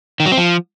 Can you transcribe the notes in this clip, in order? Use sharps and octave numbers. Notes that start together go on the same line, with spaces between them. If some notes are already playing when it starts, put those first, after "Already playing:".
D#3
F#3
C4
F3